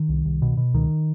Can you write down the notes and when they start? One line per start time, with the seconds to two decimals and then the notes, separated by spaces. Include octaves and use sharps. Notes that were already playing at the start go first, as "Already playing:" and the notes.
Already playing: D#3
0.09 C2
0.25 C2
0.42 B2
0.57 B2
0.74 C#2 D#3